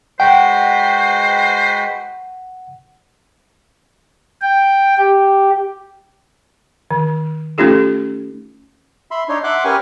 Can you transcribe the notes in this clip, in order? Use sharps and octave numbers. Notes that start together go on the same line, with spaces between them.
G#3 F#4 B4 C5 F#5 G5
G5
G4
D#3
A3 C#4 D#4 F4 G4 A4
E5 B5 C6
D4 D#4 C#5 C6
E5 F#5 C6 D6 F#6
C#4 G4 A#4 B4 G#5 C#6